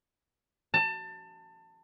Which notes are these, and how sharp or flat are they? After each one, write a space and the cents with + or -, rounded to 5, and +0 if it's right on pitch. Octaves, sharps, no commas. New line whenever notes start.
A5 +25